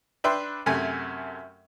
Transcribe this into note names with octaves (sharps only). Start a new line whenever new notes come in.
D4 B4 E5 G5 C6
F#2 C3 A3 G#5